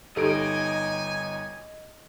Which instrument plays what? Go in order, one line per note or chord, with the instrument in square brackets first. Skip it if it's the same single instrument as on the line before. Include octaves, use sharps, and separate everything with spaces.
[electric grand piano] G1 D#4 D7 [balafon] G4 A4 [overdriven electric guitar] D#5 [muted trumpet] G#5